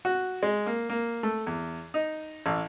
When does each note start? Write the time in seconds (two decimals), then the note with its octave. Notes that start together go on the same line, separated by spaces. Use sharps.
0.05 F#4
0.43 G#3
0.66 A#3
0.90 A#3
1.23 A3
1.47 E2
1.94 D#4
2.46 A1